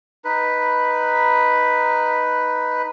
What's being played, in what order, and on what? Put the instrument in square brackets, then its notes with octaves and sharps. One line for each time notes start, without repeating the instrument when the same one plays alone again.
[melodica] D#4 B4 B5